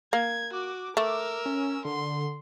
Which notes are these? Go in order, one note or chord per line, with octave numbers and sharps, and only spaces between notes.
A#3 G#6
F#4 D6
A3 A#4 D6 E6
C#4
D3 C6